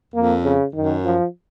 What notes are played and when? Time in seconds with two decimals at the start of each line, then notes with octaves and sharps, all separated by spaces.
0.14 F2 A#3
0.44 C#3
0.74 F#2 D#3
1.04 F3